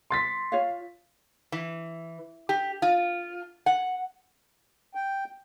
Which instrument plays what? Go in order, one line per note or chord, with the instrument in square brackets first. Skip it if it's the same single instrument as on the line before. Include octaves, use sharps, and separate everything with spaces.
[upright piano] C6 A6 B6
[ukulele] F4 C#5 F5
[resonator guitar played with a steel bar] E3
G4
F4
F#5
[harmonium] G5